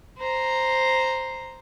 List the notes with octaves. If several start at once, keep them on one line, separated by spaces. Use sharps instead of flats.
C5 A#5